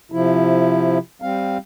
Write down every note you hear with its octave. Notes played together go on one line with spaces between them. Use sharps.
C3 F3 E4
G3 C4 F5